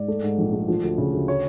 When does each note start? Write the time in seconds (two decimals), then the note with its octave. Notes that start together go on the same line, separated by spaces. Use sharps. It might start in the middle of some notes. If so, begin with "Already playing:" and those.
Already playing: G#2 D5
0.08 A3
0.23 G#2
0.38 A#1
0.53 A3
0.68 F3
0.83 D2
0.98 C#3
1.13 D2
1.28 C#5